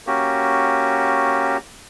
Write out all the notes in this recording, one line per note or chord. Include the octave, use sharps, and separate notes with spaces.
A#3 C#4 F#4 G4